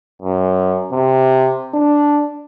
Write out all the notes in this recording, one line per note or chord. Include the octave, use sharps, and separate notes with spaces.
F#2
C3
D4